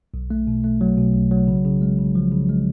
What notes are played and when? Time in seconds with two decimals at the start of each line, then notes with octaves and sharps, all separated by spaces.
0.14 B1
0.30 A3
0.47 B2
0.64 A3
0.81 F#3
0.97 B2
1.14 B1
1.31 F#3
1.48 C#3
1.65 C#3
1.82 G#3
1.99 C#3
2.15 F3
2.32 C#3
2.49 G#3